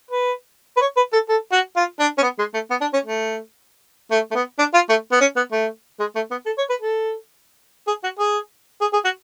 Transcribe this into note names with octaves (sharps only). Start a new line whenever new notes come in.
B4
B4
C#5
B4
A4
A4
F#4
F4
D4
C#4
B3
G#3
A3
B3
D4
C#4
A3
A3
A3
B3
D4
F4
A3
B3
C#4
B3
A3
G#3
A3
B3
A4
C#5
B4
A4
G#4
F#4
G#4
G#4
G#4
F#4